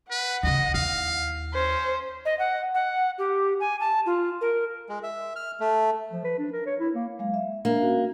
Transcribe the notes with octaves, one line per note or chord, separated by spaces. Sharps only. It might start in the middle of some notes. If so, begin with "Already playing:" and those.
B4 F#5
D2 C#3 D#5
D#2 E4 F5
C#4 C5
D#5
F#5
F#5
G4
G#5
A5
F4
A#4
G#3
E5
F6
A3
F3
B4
D4
A#4
C#5
E4
A#3
F#3 G#3 F5
E5
A#3 D4
C#4 F#4